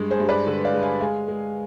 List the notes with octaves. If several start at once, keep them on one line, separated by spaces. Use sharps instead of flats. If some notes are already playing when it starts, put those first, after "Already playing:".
Already playing: G2 G#3
G#4 C5
G2
B4 D5
D3
D5 F5
G#3
F5 G#5
G#3 F5 G#5
G#3